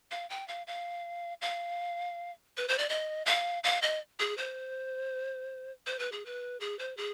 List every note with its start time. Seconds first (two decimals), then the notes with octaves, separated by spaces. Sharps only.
0.11 F5
0.30 G5
0.48 F5
0.67 F5
1.42 F5
2.57 B4
2.68 C5
2.78 D5
2.89 D#5
3.26 F5
3.64 F5
3.82 D#5
4.20 G#4
4.38 C5
5.87 C5
5.99 B4
6.12 G#4
6.26 B4
6.60 G#4
6.79 C5
6.97 G#4